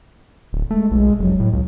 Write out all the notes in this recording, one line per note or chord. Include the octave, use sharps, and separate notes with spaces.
D1
G#3 A3
B1 G#3
F1 F#3
A2
C#2